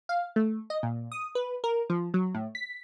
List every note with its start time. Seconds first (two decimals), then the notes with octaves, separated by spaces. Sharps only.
0.09 F5
0.36 A3
0.70 D#5
0.83 A#2
1.12 D#6
1.35 B4
1.64 A#4
1.90 F3
2.14 F#3
2.34 A2
2.55 B6